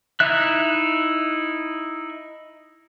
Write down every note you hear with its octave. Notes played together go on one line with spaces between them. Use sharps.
D#4 E4 E5 F#6